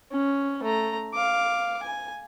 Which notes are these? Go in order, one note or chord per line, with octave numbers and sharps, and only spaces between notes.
C#4
A3 A#5
F5 D6
G#5